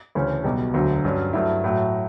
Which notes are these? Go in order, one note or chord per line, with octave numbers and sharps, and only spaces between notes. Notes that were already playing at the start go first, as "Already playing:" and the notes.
D2 C#3 E3 A3 C#4
B1 B2 G3
E1 D2 D3 F#3
G2 F#3 C#4
G2 F#3 A3 E4
A2 F#3 A3